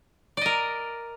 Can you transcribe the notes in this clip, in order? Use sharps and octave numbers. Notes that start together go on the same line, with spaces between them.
A#4 D5 D#5